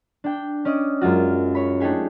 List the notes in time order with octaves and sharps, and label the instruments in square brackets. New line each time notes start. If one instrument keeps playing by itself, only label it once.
[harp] D4 G5
C#4 D5 D#5
F#2 G#3 F4 F#4
C#5 B5
A3 D4 D#4 G4 G#4